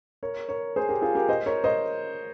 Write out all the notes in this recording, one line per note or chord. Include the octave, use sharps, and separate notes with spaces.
A#4 C#5
A#4 C#5
G#4 C5
G4 A#4
F4 G#4
G4 A#4
C5 D#5
A#4 C#5
C5 D#5